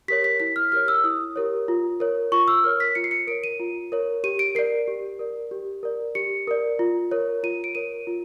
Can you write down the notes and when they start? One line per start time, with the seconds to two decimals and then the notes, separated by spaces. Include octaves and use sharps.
0.08 G4 A#4 C#5 B6
0.24 B6
0.40 E4 B6
0.56 F6
0.72 G4 A#4 C#5 F6
0.88 E6
1.04 E4 D#6
1.36 G4 A#4 C#5
1.68 F4
2.00 A#4 C#5
2.32 F4 C#6
2.48 E6
2.64 A#4 C#5 F6
2.80 B6
2.95 F4 C#7
3.04 C7
3.11 C#7
3.27 A#4 C#5 D7
3.44 D#7
3.60 F4
3.92 A#4 C#5
4.24 G4 D#7
4.39 D7
4.55 A#4 D5 C7
4.88 G4
5.19 A#4 D5
5.51 G4
5.83 A#4 D5
6.15 G4 C#7
6.48 A#4 D5
6.79 F4
7.11 A#4 C#5
7.43 F4 D#7
7.64 D7
7.75 A#4 C#5 D#7
8.07 F4